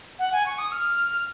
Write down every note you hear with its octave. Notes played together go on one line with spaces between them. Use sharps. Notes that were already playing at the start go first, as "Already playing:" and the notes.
F#5
G#5
C#6
D#6
F6